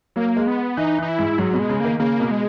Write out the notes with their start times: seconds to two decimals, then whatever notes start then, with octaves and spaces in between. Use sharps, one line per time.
0.16 F#3 A#3
0.37 G#3
0.47 B3
0.77 E3 D#4
0.98 E3 D#4
1.08 E4
1.19 G#2
1.38 G#2 F#3
1.54 B2
1.59 G#3
1.69 C#3
1.80 D#3 A#3
2.00 C#3 A#3
2.20 B2
2.31 G#3